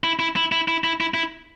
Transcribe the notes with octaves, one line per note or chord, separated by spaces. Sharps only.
E4
E4
E4
E4
E4
E4
E4
E4